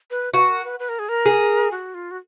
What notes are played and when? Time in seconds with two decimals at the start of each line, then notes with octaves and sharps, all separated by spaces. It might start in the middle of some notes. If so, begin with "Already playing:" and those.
0.11 B4
0.34 F#4 B4
0.49 A#4
0.64 B4
0.80 B4
0.89 A#4
0.99 G#4
1.09 A#4
1.26 G#4
1.71 F#4
1.94 F4
2.11 F#4